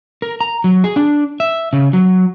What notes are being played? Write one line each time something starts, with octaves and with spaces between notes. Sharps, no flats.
A#4
A#5
F#3
G#4
D4
E5
C#3
F#3